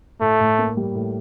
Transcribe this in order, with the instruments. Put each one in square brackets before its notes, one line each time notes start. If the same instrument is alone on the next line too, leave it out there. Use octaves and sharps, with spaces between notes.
[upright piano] A2 [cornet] A3
[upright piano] A2
A#3
G3
A2